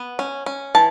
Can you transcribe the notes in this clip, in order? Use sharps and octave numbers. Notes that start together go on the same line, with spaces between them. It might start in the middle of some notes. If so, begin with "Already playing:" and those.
Already playing: B3
C#4
C#4
E3 A5